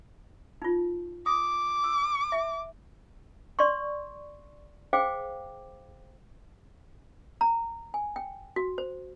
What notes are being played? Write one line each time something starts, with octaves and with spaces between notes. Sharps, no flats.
D#4 F4
D6 D#6
E6
E5
D5 C6 C#6
G#4 C5 F5 G5 D6
A#5
G#5
G5
F#4
C5